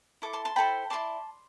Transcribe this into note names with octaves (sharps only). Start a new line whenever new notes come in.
E4 A4 D6
A5 C6
A5 C6
E4 A4 C5 G5 B5
E4 B4 D5 A5 C6